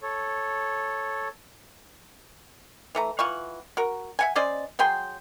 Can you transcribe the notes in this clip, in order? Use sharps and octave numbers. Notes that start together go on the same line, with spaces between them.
A4 C#5
E3 A3 A#5
E3 F4 F#5 C#6
F#4 A#4
E5 F#5 G#5
C#4 C5 D5 D#5
F#3 G#4 G5 C6